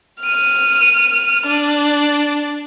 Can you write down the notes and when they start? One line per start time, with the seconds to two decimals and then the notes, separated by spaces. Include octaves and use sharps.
0.22 F6 D#7
1.47 D4